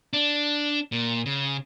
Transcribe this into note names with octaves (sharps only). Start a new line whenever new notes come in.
D4
A#2
C#3